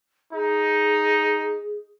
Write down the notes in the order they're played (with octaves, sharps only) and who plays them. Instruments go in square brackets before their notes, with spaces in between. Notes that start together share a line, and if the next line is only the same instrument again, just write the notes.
[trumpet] D#4 [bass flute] G#4